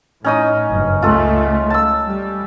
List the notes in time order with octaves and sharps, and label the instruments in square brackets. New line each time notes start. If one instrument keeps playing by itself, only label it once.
[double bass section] A2 [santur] C#4 D#4 D#6
[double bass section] F#1 G2
[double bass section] C#2 C#3 A3 [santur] F4 A4
[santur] A5 E6
[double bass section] G3